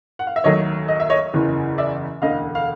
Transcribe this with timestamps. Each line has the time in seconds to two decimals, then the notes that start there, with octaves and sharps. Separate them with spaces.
0.19 F#5
0.27 F5
0.36 E5
0.44 D#2 D#3 F#3 A3 C#5 D#5
0.88 D#5
1.00 E5
1.10 C#5 D#5
1.33 F#1 E2 C#3 E3
1.78 D5 E5
2.22 E1 D2 D3 D#5 F5
2.55 F5